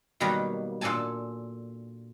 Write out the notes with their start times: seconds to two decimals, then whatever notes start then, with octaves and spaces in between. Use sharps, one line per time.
0.20 B2 D#3 F#3 G3 A#3
0.81 A#2 D4 A4 G#5 A5